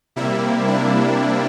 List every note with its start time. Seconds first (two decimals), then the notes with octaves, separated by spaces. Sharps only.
0.16 C3 G3 A#3 E4
0.68 D4